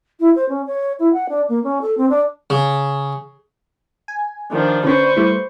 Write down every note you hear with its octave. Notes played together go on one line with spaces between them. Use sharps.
E4
C5
C#4
C#5
E4
F#5
D4
A#3
C#4
A4
C4
D4
C#3
G#5
D#3 F3 D4
D3 C#4 D4 B4 C5 C#6
G3 A3 E4